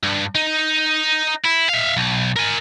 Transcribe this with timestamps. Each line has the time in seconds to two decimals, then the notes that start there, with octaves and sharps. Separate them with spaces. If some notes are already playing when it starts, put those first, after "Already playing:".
0.03 G2
0.35 D#4
1.44 E4
1.69 E5 F5
1.97 B1
2.36 A#4 G#5